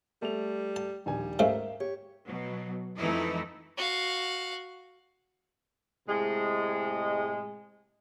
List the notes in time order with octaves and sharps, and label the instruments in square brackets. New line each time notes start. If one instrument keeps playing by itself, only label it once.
[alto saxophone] G3 [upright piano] A3 F7
[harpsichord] A5
[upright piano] A#1 D#2 G#5 [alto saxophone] G3
[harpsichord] G#2 C#3 A3 [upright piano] A#4 E5 F5
[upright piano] G4 [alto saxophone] C#5
[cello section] B2 F#3
F2 E3 A3 D#4 E4 D#5
[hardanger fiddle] F#4 F5
[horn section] A2 C3 G#3